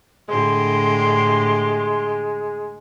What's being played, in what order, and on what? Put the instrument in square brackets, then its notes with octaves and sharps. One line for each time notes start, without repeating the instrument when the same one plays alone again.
[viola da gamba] A2 D3 G4 [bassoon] G#3 [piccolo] C6